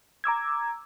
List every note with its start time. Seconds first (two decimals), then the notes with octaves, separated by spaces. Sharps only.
0.24 A#5 D6 E6 G#6